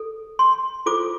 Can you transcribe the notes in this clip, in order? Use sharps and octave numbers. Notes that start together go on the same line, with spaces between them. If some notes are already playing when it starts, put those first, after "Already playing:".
Already playing: A4
C6
F4 A4 C5 D6